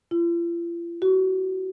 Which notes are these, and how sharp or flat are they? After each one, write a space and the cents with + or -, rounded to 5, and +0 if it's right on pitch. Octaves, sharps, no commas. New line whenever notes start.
F4 -45
F#4 +30